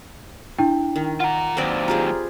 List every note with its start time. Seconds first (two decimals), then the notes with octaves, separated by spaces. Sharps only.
0.59 D4 E4 G5
0.96 D#3
1.20 F4 F#5 A#5
1.57 D#2 F#3 C4 B4 D5
1.88 F4 G4 G#4 A#5